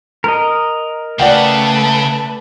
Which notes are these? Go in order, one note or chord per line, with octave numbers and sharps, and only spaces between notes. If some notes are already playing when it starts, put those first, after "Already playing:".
A#4 D#5
C#3 A3 B4 D5 F#5 G5 A5